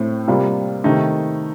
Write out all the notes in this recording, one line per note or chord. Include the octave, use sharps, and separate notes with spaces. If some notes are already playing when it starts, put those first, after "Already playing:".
Already playing: A2 A3 C4
C3 G3 A#3 F4
C3 D#3 A3 D#4